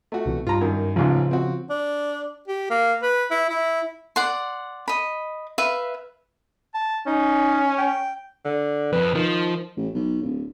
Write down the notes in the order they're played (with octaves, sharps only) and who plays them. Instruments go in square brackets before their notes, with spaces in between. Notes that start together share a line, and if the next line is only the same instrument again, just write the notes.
[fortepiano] A3 F#4
[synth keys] C2 B2 E3
[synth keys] G2 [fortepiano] F4 A#5
[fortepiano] F#2 D#3
[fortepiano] A1 G#2 [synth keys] C#3 F3
[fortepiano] C4 F#4
[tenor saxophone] D4
G4
A#3
B4
E4
E4
[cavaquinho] D5 F#5 C6
D#5 B5
B4 E5 F5
[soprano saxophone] A5
[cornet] C#4 [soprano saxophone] D#4
[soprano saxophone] G5
[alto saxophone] D3
[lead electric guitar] F2 [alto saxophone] B4
[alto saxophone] D#3 [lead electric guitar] F3
[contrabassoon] A1
B1
D1